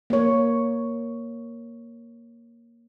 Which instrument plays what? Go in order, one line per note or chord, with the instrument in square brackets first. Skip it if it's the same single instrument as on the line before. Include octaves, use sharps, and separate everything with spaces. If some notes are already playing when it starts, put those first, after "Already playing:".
[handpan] A#3 C#5